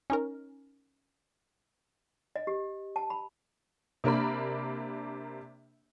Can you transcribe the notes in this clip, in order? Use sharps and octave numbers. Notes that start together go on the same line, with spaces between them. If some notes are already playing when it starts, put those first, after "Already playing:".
C#4 D#4 A#4
D#5
G4
A5
B5
C3 A#3 D4 A#4 B5